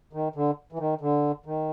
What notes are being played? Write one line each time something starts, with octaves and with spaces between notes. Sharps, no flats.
D#3
D3
E3
D#3
D3
D#3